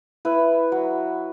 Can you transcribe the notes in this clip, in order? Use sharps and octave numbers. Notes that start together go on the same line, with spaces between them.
E4 B4
F#3